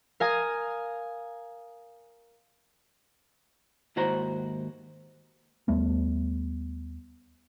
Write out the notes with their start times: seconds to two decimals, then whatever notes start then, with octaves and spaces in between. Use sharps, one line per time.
0.20 A#4 F5 G#5 D#6
3.96 D#2 G#2 E4 F#4 C5 A#5
5.68 D#2 G3 A3 B3